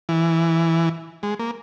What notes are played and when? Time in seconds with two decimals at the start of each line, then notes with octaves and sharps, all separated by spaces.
0.09 E3
1.23 G#3
1.39 A#3